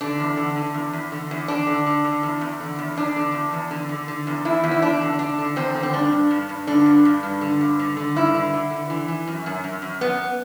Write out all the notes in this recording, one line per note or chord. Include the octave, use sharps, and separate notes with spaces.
D3 D4
E2
D3
D3
E2
E2
D3
E2
D3 D4
D3
D3
D3
E2
E2
D3
E2
E2 D4
D3
E2
E2
D3
D3
D3
E2
E2 E4
E2
E4
E2 D4
D3
D3 D4
D3
E2 C4
D3
C4
G2 D4
G2
G2
G2
D3 D4
G2
G2
G2
D3
G2
D3
D3
G2 E4
D3
D3
D3
E3
E3
F#2
F#2
F#2
F#2
F#2 B3